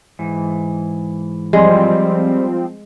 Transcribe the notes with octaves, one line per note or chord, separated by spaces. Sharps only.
G#2 E3
F3 G3 G#3 C4 C6